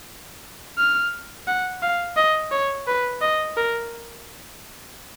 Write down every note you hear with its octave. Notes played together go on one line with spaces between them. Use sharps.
F6
F#5
F5
D#5
C#5
B4
D#5
A#4